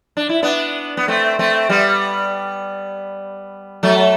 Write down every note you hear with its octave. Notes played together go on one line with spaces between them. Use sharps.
D4
E4
B3 D4
B3
A3 C4
A3 C4
G3 B3
F#3 A3